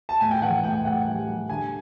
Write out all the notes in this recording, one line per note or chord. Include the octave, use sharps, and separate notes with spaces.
A5
A2 G#5
G5
E3 F#5
A2 G5
A2 F#5
G3
G3
D3 G#5